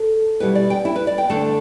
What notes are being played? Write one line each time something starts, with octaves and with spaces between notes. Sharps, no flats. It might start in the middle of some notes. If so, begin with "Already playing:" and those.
Already playing: A4
B2 G3 E4 B4
D5
G5
E4
B4
D5
G5
D3 A3 D4 A5